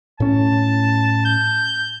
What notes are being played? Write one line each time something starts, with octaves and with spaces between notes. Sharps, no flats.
A2 C#4 A5
G6